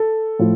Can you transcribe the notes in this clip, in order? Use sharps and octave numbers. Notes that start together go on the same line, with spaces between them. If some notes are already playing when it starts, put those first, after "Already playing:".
Already playing: A4
A2 F3